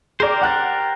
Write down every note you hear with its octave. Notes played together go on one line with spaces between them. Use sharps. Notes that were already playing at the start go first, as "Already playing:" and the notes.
G4 G#4 A#4 C5 D5
F#5 F#6 A6